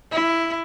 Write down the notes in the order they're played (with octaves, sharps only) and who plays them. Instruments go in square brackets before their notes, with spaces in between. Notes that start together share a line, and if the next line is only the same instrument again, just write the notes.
[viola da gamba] E4